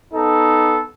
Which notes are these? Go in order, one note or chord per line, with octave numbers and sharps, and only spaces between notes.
B3 D#4 A4